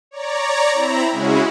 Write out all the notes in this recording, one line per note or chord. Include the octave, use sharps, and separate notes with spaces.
C#5 D5 A#5
C4 E4 A#5 B5
C#3 G#3 C#4 E4 F#4 G#4